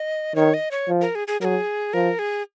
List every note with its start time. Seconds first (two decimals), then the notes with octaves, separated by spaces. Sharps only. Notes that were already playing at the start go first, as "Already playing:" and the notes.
Already playing: D#5
0.36 D#3 C#5
0.54 D#5
0.71 C#5
0.88 F3
1.01 A#4
1.15 G#4
1.28 G#4
1.41 F#3 A#4
1.45 G#4
1.93 F3 A#4
2.19 G#4